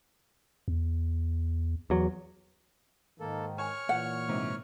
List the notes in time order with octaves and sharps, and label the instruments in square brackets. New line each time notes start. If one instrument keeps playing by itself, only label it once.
[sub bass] E2
[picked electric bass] E2 F#3
[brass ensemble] G#2 D#3 [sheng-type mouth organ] A#3 A4
[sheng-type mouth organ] C#5 C#6 F6 [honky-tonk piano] G#5
[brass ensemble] A#2 E3 [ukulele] F#5
[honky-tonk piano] G#2 C3